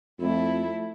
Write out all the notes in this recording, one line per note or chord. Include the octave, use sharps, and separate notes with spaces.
F2 A3 E4